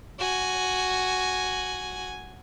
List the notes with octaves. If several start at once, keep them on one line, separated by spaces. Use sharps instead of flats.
F#4 G#5